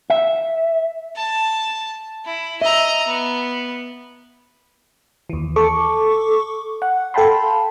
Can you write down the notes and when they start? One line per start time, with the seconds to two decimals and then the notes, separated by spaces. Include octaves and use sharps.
0.10 E5
1.16 A5
2.25 E4
2.61 D#5 E5 A#5
3.07 B3
5.30 D#2 E3
5.56 A4 C#6 D6
6.82 F#5
7.14 A4 F5 G5 A5 B5 C6